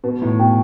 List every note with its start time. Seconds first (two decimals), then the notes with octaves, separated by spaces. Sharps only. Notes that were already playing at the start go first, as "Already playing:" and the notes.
0.04 B2 B4
0.22 A2
0.39 B2 G5